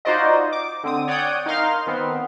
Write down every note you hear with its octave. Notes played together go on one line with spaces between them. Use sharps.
D#4 F4 F#4 C5 D5 D#5
D6
D3 C4 D#6
C#5 D5 F#5 G5 D#6 G6
D#4 A#4 F5 C6 F6
D#3 B3 C4